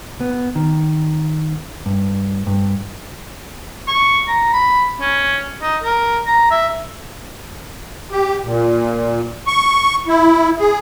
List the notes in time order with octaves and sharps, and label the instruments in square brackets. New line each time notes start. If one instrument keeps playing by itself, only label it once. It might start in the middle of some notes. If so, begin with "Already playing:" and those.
[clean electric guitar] B3
D#3
G2
G2
[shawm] C#6
A#5
B5
C#4
D#4
A#4
A#5
E5
[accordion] G4
A#2
C#6
E4
G#4